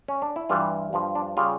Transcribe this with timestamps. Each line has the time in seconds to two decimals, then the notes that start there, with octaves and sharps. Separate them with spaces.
0.08 C#4
0.22 D4
0.36 E4
0.49 G2 E3 G3 F4
0.93 G2 F3
1.15 D4
1.37 C#3 G3 F4